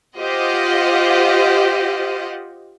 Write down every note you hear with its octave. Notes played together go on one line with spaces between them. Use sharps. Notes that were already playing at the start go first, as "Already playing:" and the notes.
F4 G4 C5 D#5 F#5